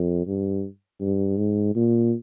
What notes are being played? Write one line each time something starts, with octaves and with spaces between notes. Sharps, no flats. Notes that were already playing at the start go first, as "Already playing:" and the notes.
Already playing: F2
G2
G2
G#2
A#2